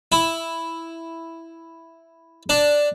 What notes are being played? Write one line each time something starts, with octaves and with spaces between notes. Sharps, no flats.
E4
D4